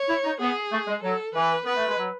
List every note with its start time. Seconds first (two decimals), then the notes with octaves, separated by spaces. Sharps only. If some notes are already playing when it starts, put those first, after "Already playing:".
Already playing: C#5
0.09 E4
0.24 D#4
0.40 B3 G#4
0.72 A3
0.87 G#3
1.03 F#3 A4
1.35 E3 B4
1.65 B3 B4
1.76 A3
1.87 G#3
1.97 F#3